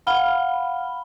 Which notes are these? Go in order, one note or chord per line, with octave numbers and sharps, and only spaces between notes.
F5 F#5 B5 F6 G7